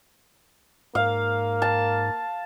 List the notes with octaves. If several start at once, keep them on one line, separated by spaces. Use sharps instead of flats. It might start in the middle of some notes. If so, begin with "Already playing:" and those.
G#2 A#3 F5
A5